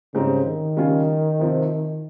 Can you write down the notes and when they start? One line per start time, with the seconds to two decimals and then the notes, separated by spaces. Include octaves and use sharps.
0.14 G#2 C#3 G3 C4
0.45 D#3
0.77 C#3 G3 C#4 F4
1.40 C3 F3 C4